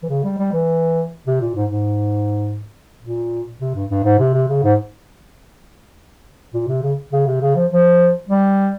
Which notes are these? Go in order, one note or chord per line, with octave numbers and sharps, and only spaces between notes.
E3
C#3
G3
G3
E3
C3
A#2
G#2
G#2
A#2
C3
G2
G2
G#2
C3
C3
C#3
G#2
A#2
C3
C#3
C#3
C3
C#3
F3
F3
G3